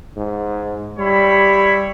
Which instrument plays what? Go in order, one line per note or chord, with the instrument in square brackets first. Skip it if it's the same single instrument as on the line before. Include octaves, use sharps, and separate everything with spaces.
[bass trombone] G#2
[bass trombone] G3 [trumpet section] E4 C#5 B5